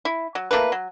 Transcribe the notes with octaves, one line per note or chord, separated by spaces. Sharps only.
E4
F#3
A3 A#3 E4 B4
F#3